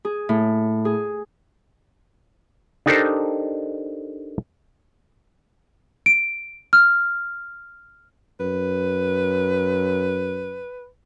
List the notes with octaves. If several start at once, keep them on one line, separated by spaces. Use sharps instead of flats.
G#4
A2
G#4
D4 D#4 G4 A4 A#4 C5
D7
F6
F#2 B4